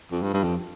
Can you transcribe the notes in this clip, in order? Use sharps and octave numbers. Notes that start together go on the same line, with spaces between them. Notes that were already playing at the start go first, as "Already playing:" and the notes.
F2
G2
G2
F2